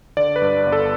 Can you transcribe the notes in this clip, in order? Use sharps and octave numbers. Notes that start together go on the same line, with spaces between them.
D3 D5
B4
G2
G1
A4